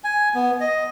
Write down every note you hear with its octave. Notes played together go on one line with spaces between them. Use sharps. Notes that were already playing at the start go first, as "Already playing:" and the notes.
G#5
B3
D#5